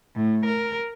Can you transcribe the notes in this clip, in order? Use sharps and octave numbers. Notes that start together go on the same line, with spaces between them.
A2
A#4